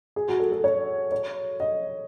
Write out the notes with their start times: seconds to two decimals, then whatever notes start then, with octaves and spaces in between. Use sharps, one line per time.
0.16 G#4
0.28 F#4
0.40 A4
0.52 A4
0.64 C#5
1.12 C#5
1.60 D#5